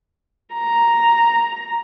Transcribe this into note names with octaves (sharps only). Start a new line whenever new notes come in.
A#5